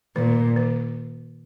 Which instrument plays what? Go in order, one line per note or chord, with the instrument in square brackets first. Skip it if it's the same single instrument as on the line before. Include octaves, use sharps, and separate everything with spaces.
[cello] A#2 [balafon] D#3
[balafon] D#3